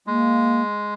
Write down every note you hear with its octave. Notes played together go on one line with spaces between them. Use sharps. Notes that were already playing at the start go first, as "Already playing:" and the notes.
G#3 A#3